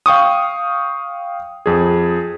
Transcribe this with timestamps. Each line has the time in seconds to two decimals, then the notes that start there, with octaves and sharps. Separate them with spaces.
0.06 F5 G5 C#6 D#6
1.66 F2 G#4